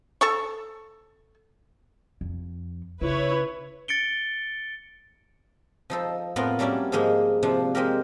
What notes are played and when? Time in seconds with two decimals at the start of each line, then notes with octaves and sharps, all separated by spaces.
0.21 A4 A5 C#6
2.21 F2
3.01 C#3 E4 B4 C#5
3.88 A6 C#7 D7 G7
5.90 F3 D#4 A4
6.36 F2 A2 B3 F4 A#4
6.59 F#3 G3 A3 A#3 C#4 D5
6.92 G#2 F3 G#3 A#3 D#4
7.43 C3 F3 D4
7.75 G#3 C4 G4 A#4